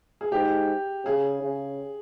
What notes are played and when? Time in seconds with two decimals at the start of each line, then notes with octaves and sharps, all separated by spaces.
0.21 G#4
0.32 G#2 G4
1.05 C#3 G#4
1.42 C#3